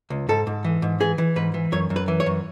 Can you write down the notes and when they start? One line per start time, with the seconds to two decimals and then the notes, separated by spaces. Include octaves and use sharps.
0.10 C#2
0.29 G#2 A4
0.47 G#2
0.64 E3
0.82 G#2
1.00 E3 G#4
1.18 E3
1.36 G#2 B4
1.54 E3
1.72 F#2 C#5
1.90 F#2
1.96 B4
2.08 E3
2.20 C#5
2.26 F#2